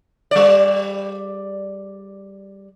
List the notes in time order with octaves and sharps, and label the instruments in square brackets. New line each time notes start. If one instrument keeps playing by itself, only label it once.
[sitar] G3 D5